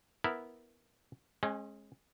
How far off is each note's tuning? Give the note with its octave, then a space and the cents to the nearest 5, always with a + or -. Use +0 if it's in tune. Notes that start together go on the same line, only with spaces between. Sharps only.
B3 +0 E4 -5 A#4 +0
G#3 +15 C#4 -35